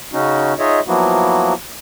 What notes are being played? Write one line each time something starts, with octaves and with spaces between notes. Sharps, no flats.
C#3 C#4 D#4 F#4
D#4 F4 G#4 C#5 D#5 E5
F3 F#3 A#3 B3 E4 F#4